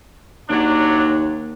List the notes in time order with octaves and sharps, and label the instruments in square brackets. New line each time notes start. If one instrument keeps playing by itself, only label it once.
[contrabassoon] D#2 [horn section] F#3 D4